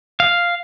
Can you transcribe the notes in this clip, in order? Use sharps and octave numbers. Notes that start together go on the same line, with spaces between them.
F5